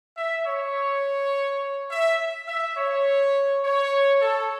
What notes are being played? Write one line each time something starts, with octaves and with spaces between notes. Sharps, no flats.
E5
C#5
E5
E5
C#5
C#5
A4